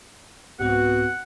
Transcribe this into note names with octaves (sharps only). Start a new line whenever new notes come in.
C2 G#2 B3 C4 F#4 F#5